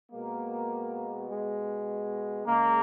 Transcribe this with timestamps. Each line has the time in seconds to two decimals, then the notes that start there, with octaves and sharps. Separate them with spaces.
0.12 B2 G#3 A#3
1.29 G#3
2.46 C#3 G#3 A#3